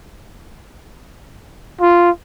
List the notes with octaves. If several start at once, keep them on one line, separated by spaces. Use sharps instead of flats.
F4